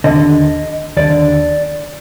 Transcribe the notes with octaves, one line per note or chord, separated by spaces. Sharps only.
D#2 D3 D#5
D#2 D3 D5